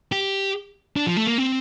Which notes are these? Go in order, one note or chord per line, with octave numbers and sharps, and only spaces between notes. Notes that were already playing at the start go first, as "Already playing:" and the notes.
G4
D4
F3
A3
A#3
C4